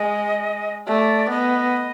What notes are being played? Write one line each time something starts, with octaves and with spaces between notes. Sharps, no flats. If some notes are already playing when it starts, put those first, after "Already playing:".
Already playing: G#3 D#5
A3 D5
B3 D#5